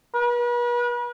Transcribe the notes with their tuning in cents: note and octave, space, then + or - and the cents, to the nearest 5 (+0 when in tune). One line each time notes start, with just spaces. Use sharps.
B4 -40